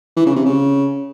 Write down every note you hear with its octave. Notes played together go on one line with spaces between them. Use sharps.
E3
C#3
C3
C#3